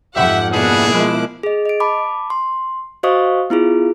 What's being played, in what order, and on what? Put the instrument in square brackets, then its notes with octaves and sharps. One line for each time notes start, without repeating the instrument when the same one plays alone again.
[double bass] F2 G#2 [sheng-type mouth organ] G4 [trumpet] E5 [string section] F#5
[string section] B2 A#3 E4 [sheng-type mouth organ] D4 B4 F#5 [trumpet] G#4
[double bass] F3 G#3 [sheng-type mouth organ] D6 F#6
[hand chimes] G#4 D#5
D#5 D7
A5 B5 D6
C6
F#4 C5 D#5 F5 C#6 D#6
B3 E4 F4 G#4